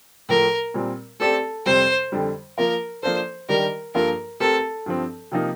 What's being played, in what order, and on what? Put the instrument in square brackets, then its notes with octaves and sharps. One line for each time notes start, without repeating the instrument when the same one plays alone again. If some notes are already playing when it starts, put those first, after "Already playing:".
[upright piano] A2 F3 A3 [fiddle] A#4
[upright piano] A#2 G3 C4
[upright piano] A3 C4 G4 D5 [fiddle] A4
[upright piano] F2 C3 G3 C4 [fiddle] C5
[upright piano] F2 D3 G3
[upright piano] F3 A#3 F4 [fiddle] A#4
[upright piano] F3 A#3 D4 A4 [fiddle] C5
[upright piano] D#3 G3 D4 G4 [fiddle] A#4
[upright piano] G2 F3 A#3 F4 A4 [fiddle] A#4
[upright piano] A3 C4 G4 A#4 [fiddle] A4
[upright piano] G2 F3 C4
C3 F3 A#3 D#4